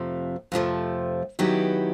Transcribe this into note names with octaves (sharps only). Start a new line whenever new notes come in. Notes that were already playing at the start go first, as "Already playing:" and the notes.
Already playing: F2 C3 F3 A3
F2 C3 F3 A3
D#3 F#3 B3 E4 G4